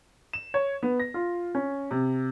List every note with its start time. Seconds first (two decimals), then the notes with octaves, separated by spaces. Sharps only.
0.33 E7
0.54 C#5
0.83 B3
1.00 A#6
1.14 F4
1.55 C#4
1.91 C3